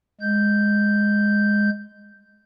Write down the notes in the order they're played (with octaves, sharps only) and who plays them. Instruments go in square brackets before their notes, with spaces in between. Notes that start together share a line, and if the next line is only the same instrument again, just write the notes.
[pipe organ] G#3 G6